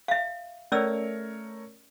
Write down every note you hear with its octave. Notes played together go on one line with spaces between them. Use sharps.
E5 F5
A3 C#4 A#4 C#5 D5 E6